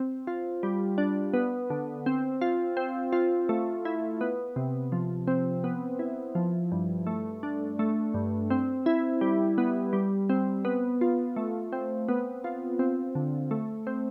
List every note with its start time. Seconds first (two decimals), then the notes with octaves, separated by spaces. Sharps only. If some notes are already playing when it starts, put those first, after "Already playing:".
Already playing: C4
0.27 F4
0.63 G3
0.98 D4
1.34 B3
1.70 D3
2.06 C4
2.41 F4
2.77 C4
3.13 F4
3.49 A3
3.85 E4
4.21 B3
4.56 C3
4.92 F3
5.28 C4
5.64 B3
5.99 E4
6.35 F3
6.72 G2
7.07 A3
7.43 D4
7.79 A3
8.14 G2
8.50 C4
8.86 E4
9.21 G3
9.58 B3
9.93 G3
10.30 C4
10.65 B3
11.01 F4
11.36 A3
11.73 C4
12.09 B3
12.44 F4
12.79 C4
13.15 D3
13.51 A3
13.87 C4